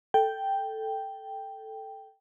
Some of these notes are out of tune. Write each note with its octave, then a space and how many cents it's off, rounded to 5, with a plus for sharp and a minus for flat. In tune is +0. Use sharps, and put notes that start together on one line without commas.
A4 +0 G5 +0